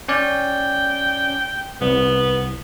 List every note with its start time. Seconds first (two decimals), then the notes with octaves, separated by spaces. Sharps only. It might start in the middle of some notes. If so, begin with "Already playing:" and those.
0.09 C#4 D5 G5
1.81 C2 B3